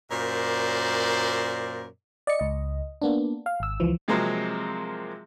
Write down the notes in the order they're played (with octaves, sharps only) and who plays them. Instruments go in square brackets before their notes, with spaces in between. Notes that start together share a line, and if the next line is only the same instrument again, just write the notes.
[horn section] F#2 A#2 A#4 C5 D5
[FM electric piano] D5 D#5 C#7
C#2 D#5
A#3 B3 D4
F5
G#1 E6
C#2 E3 F3
[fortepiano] C3 F3 F#3 G#3 A#3 C4